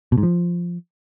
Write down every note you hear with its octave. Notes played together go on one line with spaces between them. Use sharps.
B2
G#2
F3